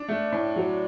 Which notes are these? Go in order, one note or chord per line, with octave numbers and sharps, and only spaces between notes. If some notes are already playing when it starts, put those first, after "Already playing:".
Already playing: D4
A3
A2
F#3